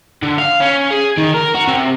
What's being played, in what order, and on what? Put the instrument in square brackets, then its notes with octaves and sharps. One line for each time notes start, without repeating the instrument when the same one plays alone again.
[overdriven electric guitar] D3
F5
C#4
G#4
D#3
A#4
F#4
C3